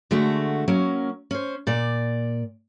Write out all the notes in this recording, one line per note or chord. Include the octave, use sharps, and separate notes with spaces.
D3 G#3 A3 F#4
F#3 A#3 C#4
C#4 C5
A#2 D5